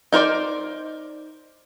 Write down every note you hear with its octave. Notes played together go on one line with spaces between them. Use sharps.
D#4 A#4 C5 D5